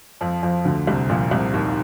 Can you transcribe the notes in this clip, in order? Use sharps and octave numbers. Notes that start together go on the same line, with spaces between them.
F2 F3
F2 F3
D2 D3
C2 C3
A#1 A#2
C2 C3
D#2 D#3